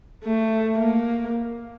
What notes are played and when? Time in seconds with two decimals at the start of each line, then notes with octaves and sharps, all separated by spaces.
0.24 A3
0.79 A#3